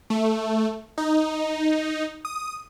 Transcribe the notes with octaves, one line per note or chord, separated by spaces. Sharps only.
A3
D#4
D#6